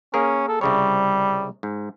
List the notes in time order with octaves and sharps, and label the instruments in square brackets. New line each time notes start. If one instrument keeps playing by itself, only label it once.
[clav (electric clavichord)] A#3 G#4 A#4 [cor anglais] C#4
[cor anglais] A4
[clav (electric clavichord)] C2 C#3 C#5 [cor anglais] G3
[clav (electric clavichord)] G#2